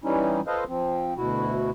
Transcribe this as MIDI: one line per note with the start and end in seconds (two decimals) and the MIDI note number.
0.04 0.41 52
0.04 0.41 55
0.04 0.41 61
0.04 0.41 63
0.04 0.41 64
0.47 0.64 65
0.47 0.64 69
0.47 0.64 71
0.47 0.64 72
0.47 0.64 75
0.47 0.64 77
0.69 1.14 53
0.69 1.14 60
1.17 1.70 38
1.17 1.70 47
1.17 1.70 64
1.17 1.70 66